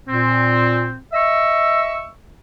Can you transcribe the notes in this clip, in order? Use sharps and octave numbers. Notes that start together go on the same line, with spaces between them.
A#2 C4
D#5 E5 C#6 E6